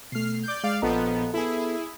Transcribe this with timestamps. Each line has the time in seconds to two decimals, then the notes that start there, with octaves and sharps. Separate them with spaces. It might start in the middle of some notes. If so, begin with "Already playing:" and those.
0.12 B2 A3 F6 C7
0.43 D5 G6
0.64 G#3 D5 F5
0.82 A#1 F3 B3 A4 D#5 A#5
1.34 B3 E4 G#4 A4